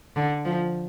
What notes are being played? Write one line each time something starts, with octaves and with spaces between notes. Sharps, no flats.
D3
F3